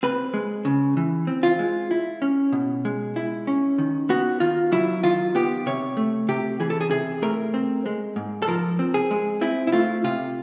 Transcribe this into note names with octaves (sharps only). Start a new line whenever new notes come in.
C4 B4
G#3
C#3
E3
C4
F4
G#3
E4
C#4
B2
G#3
E4
C#4
D#3
B3 F#4
D#3 F4
F#3 E4
D#3 F4
B3 G4
C3 C#5
A3
C3 G4
E3 G#4
A4
G#4
C3 G#4
A3 A#4
C4
G#3
G#2
A4
F3 A#4
C4
G#4
G#3
C4 E4
E4
A3 F4
C3 F4